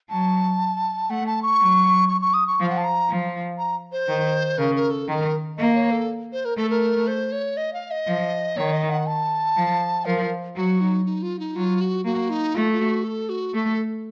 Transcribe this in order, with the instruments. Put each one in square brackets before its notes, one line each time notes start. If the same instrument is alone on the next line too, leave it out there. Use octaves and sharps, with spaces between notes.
[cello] F#3 [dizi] A5
[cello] A3 [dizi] F#5
[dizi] A5
C#6
[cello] F#3
[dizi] C#6
C#6
D#6
C#6
[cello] F3 [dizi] F5
[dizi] F#5
A5
A#5
[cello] F3
[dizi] A#5
C5
[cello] D#3
[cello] C#3 [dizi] A#4
[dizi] A#4
A4
[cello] D#3 [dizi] A#4
[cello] A#3 [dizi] D#5
[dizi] C#5
A4
C5
A#4
[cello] A3 [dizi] A4
[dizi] A#4
C5
C#5
D#5
F5
D#5
[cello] F3
[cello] D#3 [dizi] C#5
[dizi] D#5
F#5
A5
[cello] F3
[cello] F3 [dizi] A#4
[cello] F#3 [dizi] F#4
[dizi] D#4
D#4
F4
D#4
[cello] F#3 [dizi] F4
[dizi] F#4
[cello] A#3 [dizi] F#4
[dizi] D#4
[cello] A3 [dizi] F4
[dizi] F4
F#4
A4
F#4
[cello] A3 [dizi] A4